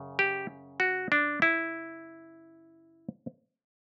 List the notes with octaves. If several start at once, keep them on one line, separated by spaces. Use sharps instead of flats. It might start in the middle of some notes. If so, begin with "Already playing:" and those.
Already playing: F#2 C#3
G4
F#4
D4
E4